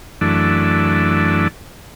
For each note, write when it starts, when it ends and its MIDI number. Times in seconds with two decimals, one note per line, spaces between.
0.21 1.48 42
0.21 1.48 52
0.21 1.48 57
0.21 1.48 62